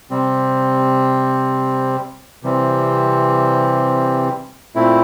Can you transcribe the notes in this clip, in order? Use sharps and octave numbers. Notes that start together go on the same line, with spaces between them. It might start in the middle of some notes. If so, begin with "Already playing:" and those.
C3 G3 C4
C3 E3 G3 C4
A#2 A3 C4 E4